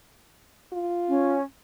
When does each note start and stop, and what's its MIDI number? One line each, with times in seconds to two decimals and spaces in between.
0.73 1.36 65
1.09 1.42 61